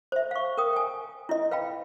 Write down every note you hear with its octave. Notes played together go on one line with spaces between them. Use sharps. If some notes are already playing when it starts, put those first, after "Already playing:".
C5 E5
F5 C#6
A#4 G5 D#6
G5 G#5
E4 D#5
B4 F5 G5 B5